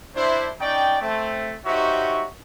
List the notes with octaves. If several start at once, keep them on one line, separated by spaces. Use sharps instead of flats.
D4 E4 C5
C#4 D#4 D5 G5
A3 C4
D#4 F#4 G4 C5 C#5 E5